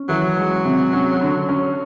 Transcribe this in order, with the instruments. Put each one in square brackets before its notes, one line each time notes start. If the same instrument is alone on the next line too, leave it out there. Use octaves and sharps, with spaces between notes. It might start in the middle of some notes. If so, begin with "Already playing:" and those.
Already playing: [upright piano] C#4
[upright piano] E3 [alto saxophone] F#3
[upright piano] G#3
C3
C#4
D3
C#4